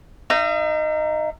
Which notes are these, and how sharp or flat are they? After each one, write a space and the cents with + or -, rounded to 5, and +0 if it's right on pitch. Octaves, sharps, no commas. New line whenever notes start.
D#4 -10 E5 +45